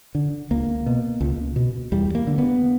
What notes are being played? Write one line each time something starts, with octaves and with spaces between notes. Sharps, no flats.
D3
C#2 A#3
B2
C#2
B2
E2 G3
A#3
D3
B3